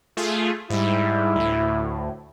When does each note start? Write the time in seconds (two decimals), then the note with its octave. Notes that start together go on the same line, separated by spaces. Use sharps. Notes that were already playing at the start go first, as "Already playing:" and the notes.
0.17 A3 F4 G#4
0.70 G#2 G3 E4
1.36 D2 A2